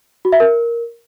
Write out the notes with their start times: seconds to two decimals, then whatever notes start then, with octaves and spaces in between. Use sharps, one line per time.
0.25 F#4
0.32 E5
0.40 A#4